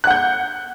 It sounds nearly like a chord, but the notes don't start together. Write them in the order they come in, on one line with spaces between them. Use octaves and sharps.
F#6 F#5 G6